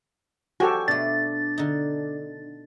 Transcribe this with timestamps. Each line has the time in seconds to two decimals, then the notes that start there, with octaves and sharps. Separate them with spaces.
0.60 F3 F#4 G4 A4 G#5
0.88 B2 A3 D4 A6
1.58 D3 D#4